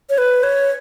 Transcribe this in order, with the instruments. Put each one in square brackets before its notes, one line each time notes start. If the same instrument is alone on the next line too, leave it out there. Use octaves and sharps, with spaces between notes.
[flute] C#5
B4
C#5